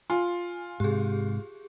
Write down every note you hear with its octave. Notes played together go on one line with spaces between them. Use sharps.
F4 G#5
G#2 C3 G4 G#4